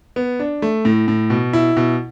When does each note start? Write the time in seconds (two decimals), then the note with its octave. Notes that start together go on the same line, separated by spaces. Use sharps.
0.16 B3
0.40 D4
0.62 A3
0.85 A2
1.08 A2
1.30 B2
1.53 E4
1.77 B2